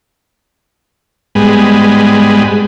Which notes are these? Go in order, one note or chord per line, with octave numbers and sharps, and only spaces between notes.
G#2 G3 G#3 B3